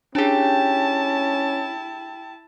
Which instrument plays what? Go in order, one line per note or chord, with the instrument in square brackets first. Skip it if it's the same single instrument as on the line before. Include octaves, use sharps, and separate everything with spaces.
[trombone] C#4 [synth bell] D4 G#4 [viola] E4 A5 [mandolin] G4 G5